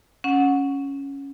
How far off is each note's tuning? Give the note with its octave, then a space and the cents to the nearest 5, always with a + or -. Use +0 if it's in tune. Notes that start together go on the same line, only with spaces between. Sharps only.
C#4 +0 F#5 -15